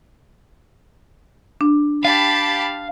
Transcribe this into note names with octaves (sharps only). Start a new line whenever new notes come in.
D4
G4 F5 A5 B5